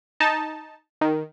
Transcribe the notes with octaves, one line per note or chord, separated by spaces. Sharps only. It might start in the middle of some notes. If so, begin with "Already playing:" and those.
D#4 A5
D#3